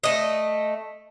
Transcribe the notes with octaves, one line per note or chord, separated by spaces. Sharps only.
A3 D#5